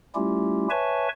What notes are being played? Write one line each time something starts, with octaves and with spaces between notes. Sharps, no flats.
G3 A3 C#4 E4 F4 G4
B4 C#5 E5 G#5 A5 C#6